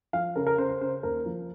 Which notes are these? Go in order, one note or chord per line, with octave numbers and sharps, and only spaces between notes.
F3 F5
C#3 A#4
A#4
C#3 C5
C5
C#3 C5
D#2 A#4
F3